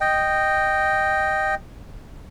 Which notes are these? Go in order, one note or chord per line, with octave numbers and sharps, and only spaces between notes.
D#5 G5